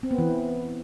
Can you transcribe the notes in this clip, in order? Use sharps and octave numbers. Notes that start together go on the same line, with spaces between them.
C4
B3
E3